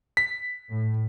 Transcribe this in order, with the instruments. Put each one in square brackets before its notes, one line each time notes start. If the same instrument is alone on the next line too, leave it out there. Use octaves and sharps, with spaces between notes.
[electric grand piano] B6
[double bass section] A2